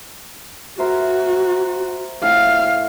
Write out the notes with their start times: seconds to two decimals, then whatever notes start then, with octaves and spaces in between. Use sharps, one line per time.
0.79 F#4 A#4 C5 E5
2.23 A2 F5